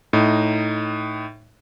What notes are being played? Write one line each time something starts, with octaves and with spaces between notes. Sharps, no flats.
A2 D#4